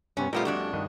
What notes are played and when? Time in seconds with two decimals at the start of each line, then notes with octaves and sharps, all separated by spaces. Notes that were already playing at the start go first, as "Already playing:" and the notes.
0.17 G2 C3 B3 C#4
0.33 A#2 G3 A3 B3 F4
0.45 F2 D4 F#4
0.73 G2 D#3 D#5